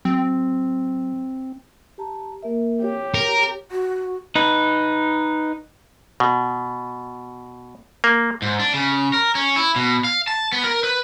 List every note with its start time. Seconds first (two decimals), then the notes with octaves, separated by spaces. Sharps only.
0.05 F#3 C4
1.98 G4 A5 A#5
2.43 A#3 A#4 E5
2.82 G4 C#5
3.14 A#4
3.71 F#4
4.35 D#4 B4
6.20 B2
8.04 A#3
8.42 G#2
8.59 D4
8.74 C#3
9.13 A#4
9.35 C#4
9.56 E4
9.76 B2
10.04 F5
10.28 A5
10.52 B3
10.64 A#4
10.84 B4